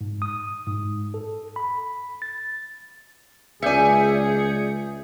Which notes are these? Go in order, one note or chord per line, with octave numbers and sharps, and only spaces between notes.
G#2
D#6
G#2
A4
B5
A6
C#2 G#4 D5 E5 G#5 G6 C#7